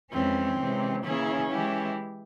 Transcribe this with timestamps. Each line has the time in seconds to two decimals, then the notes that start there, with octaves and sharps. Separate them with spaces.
0.12 F2 E3 G#3 C4 C#4
0.58 C3 E3 G#3 C#4
1.04 C#3 E3 A#3 C#4 E4 G#4
1.50 E3 G#3 E4 G4